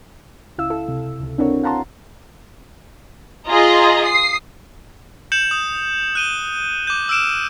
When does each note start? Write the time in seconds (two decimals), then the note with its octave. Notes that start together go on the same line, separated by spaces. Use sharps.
0.58 C#2 C#3 E4 F5 E6
0.70 E4 A4
0.88 C3
1.20 C#2 C3
1.38 C4 D4 E4 F#4 A#4 C#5
1.63 F5 F#5 A5 A#5 C6
3.48 F4 G#4 D#5 A#5
4.04 D#6 C7
5.32 G6 C#7 E7 F#7
5.51 D#6
6.15 F#6 D#7 G7
6.87 D6 G6
7.09 E6 F6 D7 E7